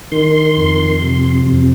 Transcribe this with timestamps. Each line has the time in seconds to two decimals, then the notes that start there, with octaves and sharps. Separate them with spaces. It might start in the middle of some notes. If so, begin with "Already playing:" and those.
0.12 D#3 C6
0.57 F2
1.02 C3
1.47 F2